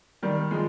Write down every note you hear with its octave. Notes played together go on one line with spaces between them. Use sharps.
D#3 G3
F3 G#3